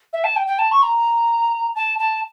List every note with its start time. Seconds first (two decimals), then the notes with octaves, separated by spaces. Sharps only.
0.13 E5
0.24 A5
0.36 G5
0.47 G5
0.59 A5
0.71 C#6
0.82 A#5
1.76 A5
1.99 A5